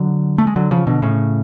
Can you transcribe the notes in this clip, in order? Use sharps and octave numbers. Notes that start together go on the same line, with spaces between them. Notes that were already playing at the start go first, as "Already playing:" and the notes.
Already playing: D3 F#3
A3
G#3
D3 F#3
C#3 F3
B2 D3
A2 C#3